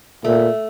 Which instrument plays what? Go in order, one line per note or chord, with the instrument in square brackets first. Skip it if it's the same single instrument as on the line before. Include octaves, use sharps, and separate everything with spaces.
[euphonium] A#2 [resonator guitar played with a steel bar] A3